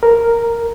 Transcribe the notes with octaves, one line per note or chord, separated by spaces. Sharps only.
A#4